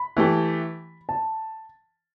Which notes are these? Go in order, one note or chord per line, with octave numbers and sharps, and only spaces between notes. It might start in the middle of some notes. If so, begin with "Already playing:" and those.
Already playing: B5
E3 A3 G4
A5